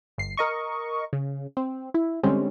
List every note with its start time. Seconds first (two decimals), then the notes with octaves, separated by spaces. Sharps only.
0.18 G1 C7
0.37 A#4 D#5 C#6
1.13 C#3
1.57 C4
1.94 E4
2.23 D3 G3 G#3 C4 C#4